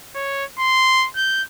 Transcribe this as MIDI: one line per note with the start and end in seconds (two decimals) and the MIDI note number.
0.15 0.45 73
0.59 1.07 84
1.16 1.43 91